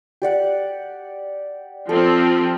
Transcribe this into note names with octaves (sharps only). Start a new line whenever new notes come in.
G4 D5 F#5
F3 C4 A4